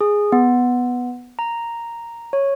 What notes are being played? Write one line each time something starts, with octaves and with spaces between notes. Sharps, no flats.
G#4
B3
A#5
C#5